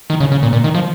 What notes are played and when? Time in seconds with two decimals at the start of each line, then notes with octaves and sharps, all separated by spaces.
0.10 D#3
0.20 C#3
0.32 C#3
0.43 A#2
0.53 A#2
0.64 D#3
0.75 F3